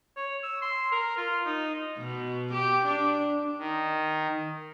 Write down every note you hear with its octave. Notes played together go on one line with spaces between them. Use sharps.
C#5
E6
C6
A#4
F4
D#4
B2
G4
D4
D#3